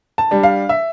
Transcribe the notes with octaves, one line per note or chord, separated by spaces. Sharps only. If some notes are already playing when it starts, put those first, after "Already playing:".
A5
G3 D4
F5
E5